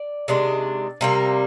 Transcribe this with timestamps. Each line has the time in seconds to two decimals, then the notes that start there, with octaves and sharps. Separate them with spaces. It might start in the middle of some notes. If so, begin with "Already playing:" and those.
Already playing: D5
0.28 C3 D#3 G#3 D4
1.01 C3 G3 A#3